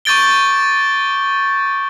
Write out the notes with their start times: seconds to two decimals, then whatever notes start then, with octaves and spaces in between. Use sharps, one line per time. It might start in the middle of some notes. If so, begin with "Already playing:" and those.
0.05 C#6 D6 G6 A6 D7 G7